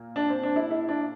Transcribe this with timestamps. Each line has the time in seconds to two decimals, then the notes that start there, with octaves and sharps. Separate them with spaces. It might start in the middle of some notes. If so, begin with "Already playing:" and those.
Already playing: A#2 A#3
0.16 D4
0.30 C4
0.43 D4
0.56 E4
0.71 E4
0.89 D4